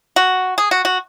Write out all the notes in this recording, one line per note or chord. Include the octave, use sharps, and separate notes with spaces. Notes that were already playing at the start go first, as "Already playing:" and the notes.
F#4
G#4
F#4
F#4